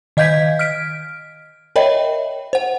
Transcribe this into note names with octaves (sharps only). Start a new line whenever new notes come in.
D#3 D#5 F5 G6 G#6 B6
F6 B6 D7
A#4 C#5 D#5 E5 G5 B5
C5 F#5